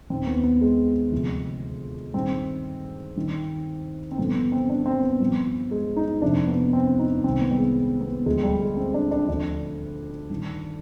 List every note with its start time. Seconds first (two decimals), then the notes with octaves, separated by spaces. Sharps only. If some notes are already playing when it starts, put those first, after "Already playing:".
0.10 D#2 D#3 C4
0.27 B3
0.44 B3
0.61 G#3
1.12 D2 C3 F3
2.14 G2 D#3 C4
3.16 G2 D#3
4.11 C4
4.18 G2 D3 F3 B3
4.35 B3
4.52 C4
4.69 D4
4.86 C4
5.03 B3
5.20 G2 F3
5.71 G#3
5.96 D#4
6.22 F2 C3 F3 D4
6.47 B3
6.73 C4
6.99 D#4
7.24 C2 C3 D#3 C4
7.41 B3
7.51 G3
7.58 G#3
8.01 B3
8.26 D2 D3 F3 G#3
8.43 G3
8.60 G#3
8.77 C4
8.94 D4
9.11 D4
9.28 D2 D3 F3 D4
10.30 G2 D#3